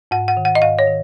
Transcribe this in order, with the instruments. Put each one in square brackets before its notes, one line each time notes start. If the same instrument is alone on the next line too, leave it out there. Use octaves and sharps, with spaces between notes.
[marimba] G#2 F#5
F#5
D#3
F#5
D#5
G#2 F5
C#5
D#3